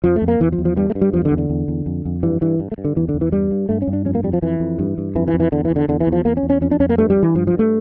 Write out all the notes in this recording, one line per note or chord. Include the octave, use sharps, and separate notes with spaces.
F2 F3
A3
F2
A#3
E2 E3
F3
E2
F3
G2 G3
A3
G2
G3
E2 F3
D3
E2
D3
E2
E2
F2
F2
G2 E3
G2 E3
G2
A3
G2
D3
E2 E3
D3
E2
E3
G2 G3
G2
G2 A3
C#4
G2
D4
F2 C#4
A#3
F2 G3
F3
F2 E3
F2
G2
G2
F2 E3
E3
F2
E3
E2 D3
E3
E2
D3
E2 D3
E3
E2
F3
E2 A#3
C#4
E2
C#4
F2 C#4
D4
F2 C#4
A#3
G2 A3
G3
G2
E3
G2 F3
F3
G2
A3